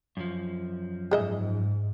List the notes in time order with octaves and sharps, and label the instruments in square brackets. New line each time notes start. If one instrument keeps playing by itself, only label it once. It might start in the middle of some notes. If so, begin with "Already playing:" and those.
[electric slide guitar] F#2 F3
[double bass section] G#2 [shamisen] G#4 D#5 E5